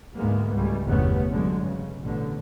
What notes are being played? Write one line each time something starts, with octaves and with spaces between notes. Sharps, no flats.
D2 G#2 B2 G#3 A#3 B3
C#2 G3 A3
G1 E2 C3 A3 B3 C#4
E2 G2 D3 F#3 G#3
C#3
A1 B2 D3